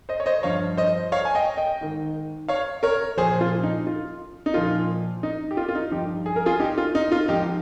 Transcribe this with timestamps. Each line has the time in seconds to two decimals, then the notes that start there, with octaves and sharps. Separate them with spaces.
0.09 C5 D#5
0.20 C#5
0.26 C5 D#5
0.43 G2 F3 C#5 F5
0.77 C5 D#5
1.12 C#5 F5
1.25 G#5
1.35 D#5 G5
1.57 D#5 G5
1.81 G#2 D#3
2.48 C#5 F5
2.83 A#4 C#5
3.17 A#2 F3 G#4 C5
3.41 F4
3.63 D#4
3.87 F4
4.46 D#4
4.54 A#2 F3 F4
5.23 D#4
5.51 G4
5.57 F4
5.69 F4
5.75 D#4
5.91 G2 F3 D#4 G4
6.26 G#4
6.36 A#4
6.46 F4 G#4
6.60 D#4 G4
6.78 F4
6.95 D#4
7.12 F4
7.28 G#2 F3 D#4 G4